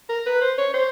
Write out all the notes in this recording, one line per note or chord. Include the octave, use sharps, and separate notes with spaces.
A#4
B4
C5
C#5
C5